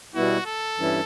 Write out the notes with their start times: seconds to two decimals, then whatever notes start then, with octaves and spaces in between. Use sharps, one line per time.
0.15 B2 G3 B3 E4 F#4
0.46 A4
0.77 G2 E3 G3 C#4 E4